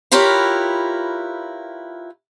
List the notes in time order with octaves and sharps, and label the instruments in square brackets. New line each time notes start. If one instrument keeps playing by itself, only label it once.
[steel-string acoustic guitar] E4 F4 G4 A#4 B4 C#5